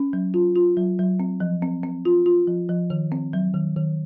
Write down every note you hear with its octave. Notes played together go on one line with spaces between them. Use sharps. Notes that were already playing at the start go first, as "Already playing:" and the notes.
Already playing: C#4
F#3
F4
F4
F#3
F#3
C4
F3
C4
C4
F4
F4
F3
F3
D#3
C4
F#3
D#3
D#3